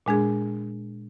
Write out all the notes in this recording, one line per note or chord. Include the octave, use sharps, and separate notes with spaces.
A#2 G#3 D4 G#4